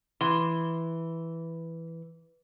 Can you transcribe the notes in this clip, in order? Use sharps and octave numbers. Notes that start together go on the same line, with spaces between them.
E3 C6